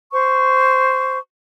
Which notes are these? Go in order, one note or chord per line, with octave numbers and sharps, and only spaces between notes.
C5 C#6